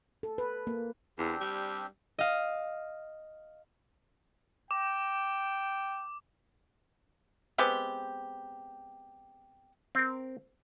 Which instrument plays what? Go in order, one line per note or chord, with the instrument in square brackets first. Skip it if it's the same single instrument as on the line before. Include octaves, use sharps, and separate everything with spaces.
[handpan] A4
B4
A#3
[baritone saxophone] E2 [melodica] C4 D4 G4
[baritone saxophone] G3
[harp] D#5 F5
[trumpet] G5 [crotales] D6
[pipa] G#3 B3 C4 G4
[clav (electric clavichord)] C4 A#4